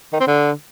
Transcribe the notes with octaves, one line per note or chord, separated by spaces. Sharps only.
D#3
C4
D3